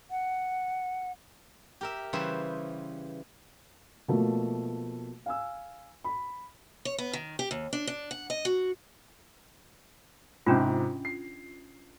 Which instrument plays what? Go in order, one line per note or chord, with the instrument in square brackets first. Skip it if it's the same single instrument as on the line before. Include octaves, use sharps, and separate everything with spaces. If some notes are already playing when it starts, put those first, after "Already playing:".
[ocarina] F#5
[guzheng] G4 A#4 E5
C#3 E3 G3 B4 C5 E5
[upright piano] B2 F3 A3 A#3
F5 G#5 E6
B5
[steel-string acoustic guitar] C#5
B3
D#3
G4
D#2
D4
D4
F#5
D#5
F#4
[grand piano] G#2 C3 [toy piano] C#4 D4 F4
[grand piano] C7